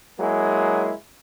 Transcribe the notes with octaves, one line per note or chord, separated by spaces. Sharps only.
F#3 G#3 A#3 E4 G#4